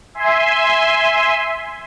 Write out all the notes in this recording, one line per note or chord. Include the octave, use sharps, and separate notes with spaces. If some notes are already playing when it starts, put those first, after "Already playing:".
E5 G#5 C6